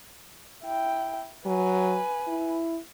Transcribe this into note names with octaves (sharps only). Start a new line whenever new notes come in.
E4 G5
F#3 B4 G#5
E4